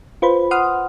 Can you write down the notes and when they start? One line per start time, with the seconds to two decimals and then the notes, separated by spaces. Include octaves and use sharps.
0.22 F4 B4 C5 B5
0.51 F#5 C6 D#6 F6